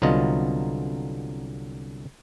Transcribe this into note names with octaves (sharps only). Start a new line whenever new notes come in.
C2 D3 F#3 B3 F4 D#5